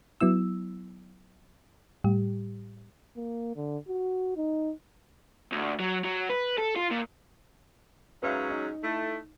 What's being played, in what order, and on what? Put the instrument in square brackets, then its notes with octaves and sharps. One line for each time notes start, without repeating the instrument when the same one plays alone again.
[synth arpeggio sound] F#3 B3 E4 E6
A2 G3 G4
[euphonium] A#3
D3
F#4
D#4
[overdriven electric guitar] D2
F#3
F#3
B4
A4
F4
A#2
[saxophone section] G#2 F#3 C#4 [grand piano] B4 E5 F5
[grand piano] D#4
[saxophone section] A3 E4